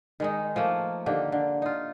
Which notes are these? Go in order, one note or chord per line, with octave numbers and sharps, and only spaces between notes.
D#3 G#3 D#4
F3 A3 A#3
D3 D#3 A#3 G4
D3
D#4 F4